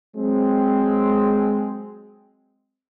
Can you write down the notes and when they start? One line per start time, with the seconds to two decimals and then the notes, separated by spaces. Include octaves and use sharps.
0.16 F#3 G#3 C4